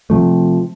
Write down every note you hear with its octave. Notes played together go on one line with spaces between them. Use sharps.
C3 F3 A3